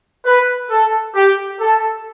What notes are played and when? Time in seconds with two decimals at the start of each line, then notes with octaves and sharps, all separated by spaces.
0.25 B4
0.70 A4
1.15 G4
1.60 A4